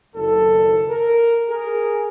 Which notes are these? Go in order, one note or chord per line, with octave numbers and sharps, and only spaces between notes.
F#1 D#2 A4
A#4
G#4 A#4